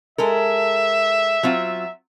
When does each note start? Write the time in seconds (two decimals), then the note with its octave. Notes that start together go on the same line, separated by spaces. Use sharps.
0.18 G#3 A4 A#4 E5
1.43 F#3 C4 F4